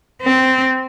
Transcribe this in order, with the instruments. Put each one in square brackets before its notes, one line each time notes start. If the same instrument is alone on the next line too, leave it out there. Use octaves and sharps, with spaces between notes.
[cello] C4